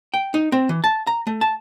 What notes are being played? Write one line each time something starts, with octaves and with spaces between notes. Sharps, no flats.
G5
D#4
C4
E3
A5
A#5
A3
A5